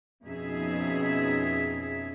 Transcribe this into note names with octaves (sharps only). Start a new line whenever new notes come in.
F2 B2 C#4 D#4 G#4 E5